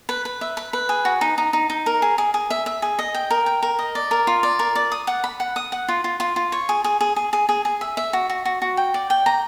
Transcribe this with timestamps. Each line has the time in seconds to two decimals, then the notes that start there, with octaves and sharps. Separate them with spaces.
0.09 B4
0.25 B4
0.41 E5
0.57 B4
0.73 B4
0.89 G#4
1.05 F#4
1.21 D#4
1.38 D#4
1.53 D#4
1.70 D#4
1.86 A#4
2.02 G#4
2.18 G#4
2.34 G#4
2.50 E5
2.66 E5
2.82 G#4
2.99 D#5
3.15 G5
3.31 A#4
3.46 G5
3.63 A#4
3.79 D#5
3.95 D5
4.11 A#4
4.27 F4
4.43 D5
4.59 A#4
4.75 D5
4.92 D#6
5.07 F#5
5.24 B5
5.40 F#5
5.56 D#6
5.72 F#5
5.89 F4
6.04 F4
6.20 F4
6.36 F4
6.52 C#5
6.69 G#4
6.84 G#4
7.01 G#4
7.16 G#4
7.33 G#4
7.49 G#4
7.65 G#4
7.81 E5
7.97 E5
8.13 F#4
8.30 F#4
8.45 F#4
8.62 F#4
8.77 G5
8.94 D5
9.10 G5
9.26 A#5